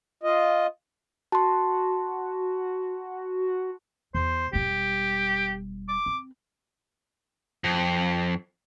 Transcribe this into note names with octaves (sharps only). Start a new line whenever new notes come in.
F4 D#5
F#4 A5 C6
E2 C5
E1 G3 G4
D6
C4
F2